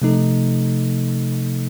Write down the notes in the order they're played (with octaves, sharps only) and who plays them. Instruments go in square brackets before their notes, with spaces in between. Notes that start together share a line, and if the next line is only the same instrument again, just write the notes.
[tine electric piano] C3 F3 A3 D#4 A4